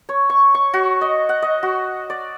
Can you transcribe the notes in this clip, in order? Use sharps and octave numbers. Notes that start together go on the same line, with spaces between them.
C#5
C#6
C#6
F#4
D#5
F#5
D#5
F#4
D5